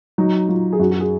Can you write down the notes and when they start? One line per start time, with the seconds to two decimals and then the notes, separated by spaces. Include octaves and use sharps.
0.18 F#3 D#4
0.49 F#3 F4
0.73 G#4
0.79 F#2 F#4
0.91 F#4
1.00 G#4